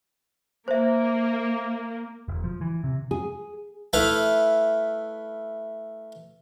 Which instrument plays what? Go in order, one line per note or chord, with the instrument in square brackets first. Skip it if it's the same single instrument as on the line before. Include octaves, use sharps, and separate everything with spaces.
[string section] A#3 [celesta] C5 E5
[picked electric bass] E1
F3
E3
C3
[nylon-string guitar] G#4
[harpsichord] A3 E4 B4 F5